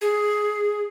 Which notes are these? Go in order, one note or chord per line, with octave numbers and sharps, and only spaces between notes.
G#4